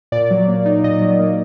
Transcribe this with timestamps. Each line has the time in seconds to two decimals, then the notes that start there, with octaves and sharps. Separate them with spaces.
0.12 A#2 D5
0.31 F#3
0.48 A#3
0.66 D#4
0.84 A#2 D#5
1.01 F#3
1.19 A#3